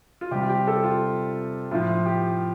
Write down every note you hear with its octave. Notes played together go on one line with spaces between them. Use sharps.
F4
C3 G3 G4
F4
G4
A4
G4
F4
A2 F3 F4
G4